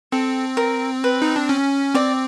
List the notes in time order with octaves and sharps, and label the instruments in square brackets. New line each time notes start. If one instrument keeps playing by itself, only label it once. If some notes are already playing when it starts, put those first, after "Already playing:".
[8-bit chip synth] C4 [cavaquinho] A4
[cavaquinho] A#4
B4
[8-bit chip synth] D#4
D4
C#4
[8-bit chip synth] C4 [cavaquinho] D5